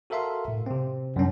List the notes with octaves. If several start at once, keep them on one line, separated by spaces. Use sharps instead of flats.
F#4 A4 A#4 E5 F5 C6
A2
C3 C4
F#2 G3 C#4 D4